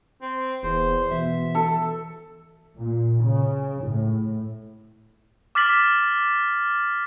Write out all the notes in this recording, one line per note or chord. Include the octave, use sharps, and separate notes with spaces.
C4
E1 E2 C5
B2 E3 E5
A4
A#2
C#3
A2
D6 F6 A6 B6 F#7